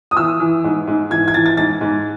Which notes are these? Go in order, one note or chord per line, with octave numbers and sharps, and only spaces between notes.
D#6
E3 E6
E3
G#2
G#2
E3 G#6
G#6
E3 A6
A6
G#2 A6
G#2